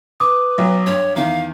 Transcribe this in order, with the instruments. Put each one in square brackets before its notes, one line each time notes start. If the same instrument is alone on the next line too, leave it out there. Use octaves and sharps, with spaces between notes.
[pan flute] B4 [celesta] D6 D#6
[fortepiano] B1 F#3
[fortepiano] G2 [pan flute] C#5
[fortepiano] E2 D#3 [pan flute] F5